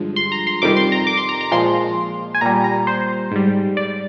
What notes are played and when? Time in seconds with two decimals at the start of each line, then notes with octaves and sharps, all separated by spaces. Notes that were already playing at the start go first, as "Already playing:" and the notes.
Already playing: G2 D3 F3 G#3
0.16 C6
0.32 A#5
0.47 C6
0.62 F2 C3 D#3 G3 D6
0.77 C6
0.92 A#5
1.07 D6
1.17 C6
1.29 A#5
1.41 A#5
1.52 A#2 F3 G#3 C6
2.35 G#5
2.41 A#2 G3 A#5
2.64 A#5
2.87 C5
3.32 G#2 G3
3.77 D5